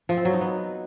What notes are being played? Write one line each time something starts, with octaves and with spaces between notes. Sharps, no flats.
F3
C4
F#3
D#4
B3